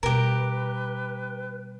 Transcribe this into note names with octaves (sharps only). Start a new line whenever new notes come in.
B2 G3 G4 A#4 B4